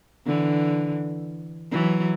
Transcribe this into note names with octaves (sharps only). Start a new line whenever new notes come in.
D3 E3
E3 F#3